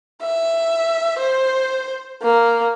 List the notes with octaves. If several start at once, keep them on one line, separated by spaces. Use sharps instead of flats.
E5
C5
A#3